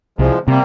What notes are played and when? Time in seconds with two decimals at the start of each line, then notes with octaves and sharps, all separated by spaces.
0.19 C2 F3 G#3
0.47 C3 G3 A#3